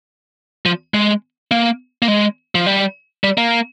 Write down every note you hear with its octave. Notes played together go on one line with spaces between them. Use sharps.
F3
G#3
A#3
A#3
G#3
F3
G3
G3
A#3